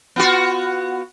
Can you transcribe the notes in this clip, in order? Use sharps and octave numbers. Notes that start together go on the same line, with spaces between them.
B3 F4 F#4